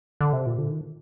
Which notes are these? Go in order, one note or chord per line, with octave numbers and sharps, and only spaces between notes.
D3
C3
A#2
D3
D#3